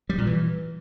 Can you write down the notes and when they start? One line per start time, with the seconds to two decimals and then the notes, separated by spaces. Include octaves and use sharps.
0.09 G3
0.18 A#2
0.27 E3